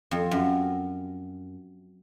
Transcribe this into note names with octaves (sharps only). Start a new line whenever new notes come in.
F2
F#2